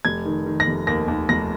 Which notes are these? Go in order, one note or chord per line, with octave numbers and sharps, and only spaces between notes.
F1 G#6
D#3
D#3
A#6
F1
D#2 A#6
D#2
F1 A#6